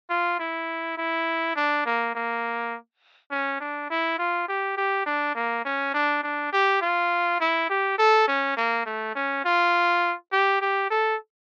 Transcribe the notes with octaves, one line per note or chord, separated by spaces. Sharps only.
F4
E4
E4
D4
A#3
A#3
C#4
D4
E4
F4
G4
G4
D4
A#3
C#4
D4
D4
G4
F4
E4
G4
A4
C#4
A#3
A3
C#4
F4
G4
G4
A4